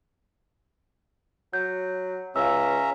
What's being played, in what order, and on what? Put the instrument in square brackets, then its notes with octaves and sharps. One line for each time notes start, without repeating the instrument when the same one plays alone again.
[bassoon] F#3 [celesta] G6
[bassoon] C#2 [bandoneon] C#4 E5 A#5 [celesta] F5 E6